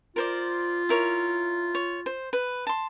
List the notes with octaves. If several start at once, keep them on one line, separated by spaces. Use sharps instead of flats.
F4 A#4 C5 D5
E4 A#4 C#5
C#5
C5
B4
A5 C6